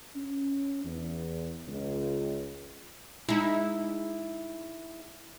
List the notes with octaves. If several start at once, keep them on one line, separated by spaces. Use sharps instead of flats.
C#4
E2
C#2
G#3 D#4 E4